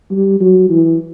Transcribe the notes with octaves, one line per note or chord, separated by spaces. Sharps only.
G3
F#3
E3